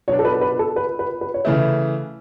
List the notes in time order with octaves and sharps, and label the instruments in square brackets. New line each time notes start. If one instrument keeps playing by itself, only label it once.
[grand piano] B2 F#3 B3 D4 [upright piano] C#5
[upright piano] A4
B4
B4
A4
B4
B4
B4
C#5
[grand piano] C#3 E3 A3 E4 [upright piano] B4